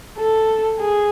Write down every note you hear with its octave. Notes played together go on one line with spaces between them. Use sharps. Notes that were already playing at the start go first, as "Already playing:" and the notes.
A4
G#4